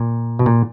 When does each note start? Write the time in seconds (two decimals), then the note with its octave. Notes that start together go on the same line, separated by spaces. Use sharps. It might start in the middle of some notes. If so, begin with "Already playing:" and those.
Already playing: A#2
0.39 B2
0.46 A#2